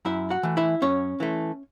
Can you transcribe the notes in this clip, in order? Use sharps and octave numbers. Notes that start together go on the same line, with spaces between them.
F#2 E4 E5
F#4 F#5
E3 A3
E4 E5
F#2 C#4 C#5
E3 A3